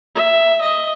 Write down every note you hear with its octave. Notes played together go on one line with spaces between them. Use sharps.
E5
D#5